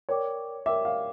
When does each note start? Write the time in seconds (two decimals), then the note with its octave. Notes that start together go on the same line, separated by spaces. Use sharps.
0.09 A#4 C#5 D5 G5 D6
0.66 A#4 D5 E5 G5 D6
0.85 F5